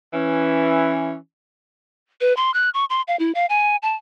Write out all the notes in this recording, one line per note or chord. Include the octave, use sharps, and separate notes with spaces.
E3 C#4
B4
C6
F#6
C#6
C6
F5
E4
F5
G#5
A5